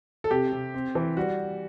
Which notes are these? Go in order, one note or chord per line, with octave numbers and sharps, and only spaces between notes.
A4
C3 G4
C3
C4
E3
G3 F#4